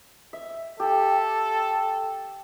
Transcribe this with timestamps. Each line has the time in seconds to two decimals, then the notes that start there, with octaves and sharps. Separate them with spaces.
0.33 E5
0.80 G4 A4